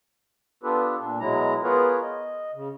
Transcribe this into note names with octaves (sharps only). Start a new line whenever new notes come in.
B3 D4 F4 G4 A4 B4
A#2 D4
B2 F#3 G#3 E4 A#5
B3 F4 G#4 A#4 B4 C#5
D#5
C#3